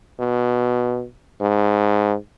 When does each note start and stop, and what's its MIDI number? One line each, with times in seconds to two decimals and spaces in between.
0.19 1.05 47
1.41 2.15 44